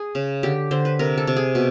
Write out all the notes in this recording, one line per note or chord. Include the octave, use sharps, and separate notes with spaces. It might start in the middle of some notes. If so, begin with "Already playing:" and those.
Already playing: G#4
C#3
D3 G4
D3 C5
B4
C3 A#4
A4
C3
G#4
B2